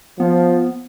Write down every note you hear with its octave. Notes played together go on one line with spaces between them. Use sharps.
F3 B3